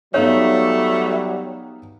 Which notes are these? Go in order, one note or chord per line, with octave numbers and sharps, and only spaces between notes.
F#3 G3 A3 B3 D#4 C#5 F5